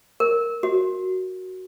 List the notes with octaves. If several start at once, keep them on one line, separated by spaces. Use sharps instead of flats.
A#4
F#4